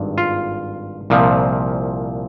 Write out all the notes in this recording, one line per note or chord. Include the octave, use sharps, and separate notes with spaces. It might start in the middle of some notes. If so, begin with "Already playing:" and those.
Already playing: G#1 G2
F4
C2 A#2 F3